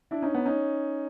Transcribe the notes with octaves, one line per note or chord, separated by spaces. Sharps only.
D4 E4
C#4 D#4
B3 C#4
C#4 D#4